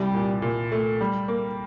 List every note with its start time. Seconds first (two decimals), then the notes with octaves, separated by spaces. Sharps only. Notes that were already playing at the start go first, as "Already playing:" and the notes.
Already playing: C2 G3
0.14 A#2
0.42 A#2
0.72 A3
1.01 G3
1.28 A#3